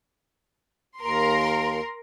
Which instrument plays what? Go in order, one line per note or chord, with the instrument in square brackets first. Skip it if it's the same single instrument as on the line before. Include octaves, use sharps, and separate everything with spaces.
[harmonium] D#2 [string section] A#4 C6